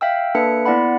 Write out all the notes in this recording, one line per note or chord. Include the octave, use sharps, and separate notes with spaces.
E5 F5 G5 E6
A#3 D4 A4 B4 E5 C#7
B3 E4 D5 F#5 B5